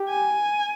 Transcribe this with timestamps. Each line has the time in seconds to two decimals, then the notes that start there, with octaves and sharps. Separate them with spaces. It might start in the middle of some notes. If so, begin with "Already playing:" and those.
Already playing: G4
0.09 G#5